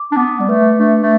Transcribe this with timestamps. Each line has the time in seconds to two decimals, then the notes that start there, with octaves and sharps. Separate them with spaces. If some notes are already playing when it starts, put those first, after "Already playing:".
Already playing: D6
0.12 D4
0.17 B3 D6
0.40 G3
0.49 A3 B4
0.79 A3 D4
1.02 A3